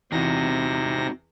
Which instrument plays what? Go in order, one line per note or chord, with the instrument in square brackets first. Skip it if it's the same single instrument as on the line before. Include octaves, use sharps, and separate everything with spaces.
[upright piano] E2 [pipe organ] C3 A#6 [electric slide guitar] C4 D#4 F#4